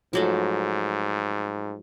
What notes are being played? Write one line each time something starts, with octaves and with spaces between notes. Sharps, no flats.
G#2 F3 F#3 A3